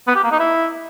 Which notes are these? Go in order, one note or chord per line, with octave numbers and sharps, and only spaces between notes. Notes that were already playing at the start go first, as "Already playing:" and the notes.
B3
G4
A#3
D#4
E4